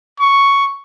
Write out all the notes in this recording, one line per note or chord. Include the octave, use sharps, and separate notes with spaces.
C#6